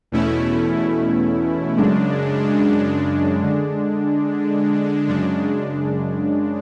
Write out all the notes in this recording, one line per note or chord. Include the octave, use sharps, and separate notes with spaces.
E2 B2 A3 C#4 E4
F#2 C#3 G#3 D4
D3 G#3 D4
F#2 C#3 G#3 D4